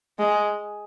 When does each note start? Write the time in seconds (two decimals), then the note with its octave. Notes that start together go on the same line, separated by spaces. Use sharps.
0.19 G#3